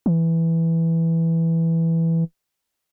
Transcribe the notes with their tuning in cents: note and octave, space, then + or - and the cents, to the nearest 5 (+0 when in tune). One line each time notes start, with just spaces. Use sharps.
E3 +0